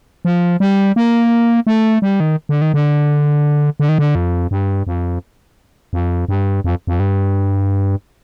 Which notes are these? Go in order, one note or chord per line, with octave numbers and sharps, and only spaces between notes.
F3
G3
A#3
A3
G3
D#3
D3
D#3
D3
D3
D#3
D3
F2
G2
F2
F2
G2
F2
F2
G2